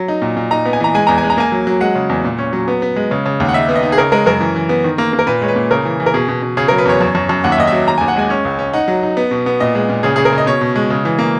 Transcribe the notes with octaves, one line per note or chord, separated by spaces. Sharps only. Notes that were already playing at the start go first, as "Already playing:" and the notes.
Already playing: F#3
D#4
A#2
A#2
D#4 A#5
B3
G#5
E3 A#5
G#3 G#5
E2 A#5
G#5
G#3
A#5
A#3 G#5
F#3
F#3
G#3 F#5
C#3
E2
A#2
C#4
F#3
B3
B3
G#3
C#3
C#3
D#2
F#5
D#4 E5
B3
D#5
D#4
G#4
C#3 A#4
G#3 A#4
F#2 A#4
E3
E3
B3
D#3
A#3
A#3
A#4
A#2 B4
G#3 C#5
B4
A#2
C#3 A#4
E3
E3
A#4
B2 G#4
B2
B2
C#3 G#4
A#4
F#3
B4
E2 C#5
F#2
F#2
F#2
D#2 F#5
E5
D#2 D#5
E5
F#3
D#2 A#5
D#2 G#5
F#5
G#3 G#5
C#4
C#2
C#4
D#4 F#5
F#3
D#4
B3
B2
B3
A#2 D#5
G#3
A#2
C#3 G#4
C#3 G#4
A#4
C#3
D#5
B2 C#5
B2
G#3
C#3
E3
A#3